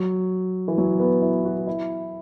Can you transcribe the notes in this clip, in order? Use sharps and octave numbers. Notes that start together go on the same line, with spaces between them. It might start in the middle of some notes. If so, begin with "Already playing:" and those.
Already playing: F#3
E3
F#3
B3
E4
F#4
E4